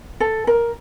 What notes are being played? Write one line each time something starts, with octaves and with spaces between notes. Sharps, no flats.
A4
A#4